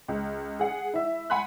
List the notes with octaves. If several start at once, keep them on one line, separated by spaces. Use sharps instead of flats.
C#2
G#4 F#5
E4 E5
F#5 G#5 B5 C6 F#6